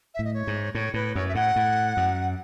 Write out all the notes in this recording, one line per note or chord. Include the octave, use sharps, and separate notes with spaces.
E5
A2
D#5
C#5
G#2
A2 C#5
A2 B4
F#2 C#5
E5
A2 F#5
A2
F#2